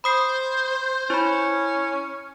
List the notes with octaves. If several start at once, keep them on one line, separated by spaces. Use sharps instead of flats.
C5 B5 D#6 C7
C#4 E4 B5